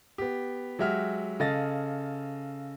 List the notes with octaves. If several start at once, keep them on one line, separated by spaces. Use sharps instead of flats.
B3 G4
F#3 G#3 G4 E5 F#5 F6
C#3 A4 D#5 F5 A6 A#6